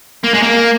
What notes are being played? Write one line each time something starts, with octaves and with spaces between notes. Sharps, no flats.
A#3
G#3
A#3